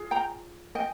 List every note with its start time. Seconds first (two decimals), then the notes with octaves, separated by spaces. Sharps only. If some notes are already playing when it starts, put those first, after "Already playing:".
Already playing: F4 G#4
0.11 G5 A#5
0.75 D#5 G5